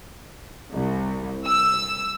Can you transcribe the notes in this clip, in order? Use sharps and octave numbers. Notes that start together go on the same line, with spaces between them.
C2
E6